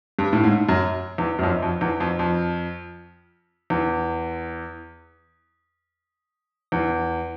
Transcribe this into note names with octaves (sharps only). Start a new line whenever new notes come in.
G2
A2
G#2
F#2
E2
F#2
F2
F2
E2
F2
F2
E2
E2